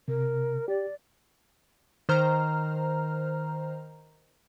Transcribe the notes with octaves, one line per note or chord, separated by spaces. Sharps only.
C3 A#4
G4 D5
D#3 C5 A#5 F6